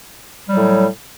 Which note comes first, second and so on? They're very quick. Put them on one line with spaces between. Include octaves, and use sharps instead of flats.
G3 F#3 A2